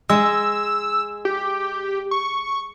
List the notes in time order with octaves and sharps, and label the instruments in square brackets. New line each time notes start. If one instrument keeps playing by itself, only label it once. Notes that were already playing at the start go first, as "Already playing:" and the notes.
[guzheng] G#3 [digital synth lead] E6
[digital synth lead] G4
C#6